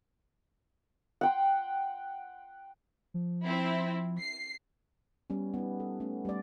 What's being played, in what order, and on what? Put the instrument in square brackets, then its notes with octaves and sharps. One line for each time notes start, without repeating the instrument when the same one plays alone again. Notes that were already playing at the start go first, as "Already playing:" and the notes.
[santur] F#5 G5 C6
[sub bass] F3
[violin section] C4 E4
C7
[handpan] G3 B3 C#4
B3 D#4 G4
A4
G3 A3 C#4
G3 A3 D5